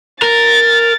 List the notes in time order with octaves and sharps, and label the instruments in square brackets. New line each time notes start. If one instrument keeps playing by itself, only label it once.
[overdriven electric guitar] A#4 [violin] A6